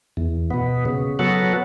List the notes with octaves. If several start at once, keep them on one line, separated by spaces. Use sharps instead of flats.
E2
B2 B3
C#3
F#3 B3 F#4 A4